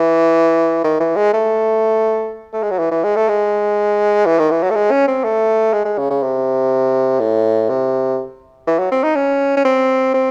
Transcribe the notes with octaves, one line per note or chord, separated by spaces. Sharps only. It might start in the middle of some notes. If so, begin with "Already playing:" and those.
Already playing: E3
D#3
E3
G#3
A3
A3
G#3
F#3
E3
E3
G#3
A3
G#3
E3
D#3
E3
F#3
A3
G#3
C#4
C4
A3
G#3
G#3
C#3
C#3
C3
A2
C3
E3
F#3
C4
D#4
C#4
C#4
C4
C4